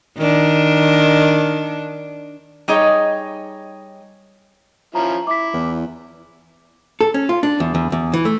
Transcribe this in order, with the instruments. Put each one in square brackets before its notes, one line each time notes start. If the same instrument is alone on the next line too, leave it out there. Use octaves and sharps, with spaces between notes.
[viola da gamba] D#3 D4
[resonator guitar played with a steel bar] G3 D#4 G#4 C#5 D#5
[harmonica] F3 C#4 E4 [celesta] A#5
[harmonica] E4 [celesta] D6 B6
[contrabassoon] E2
[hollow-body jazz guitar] A4
C#4
F4
D4
E2
E2
E2
E3
A3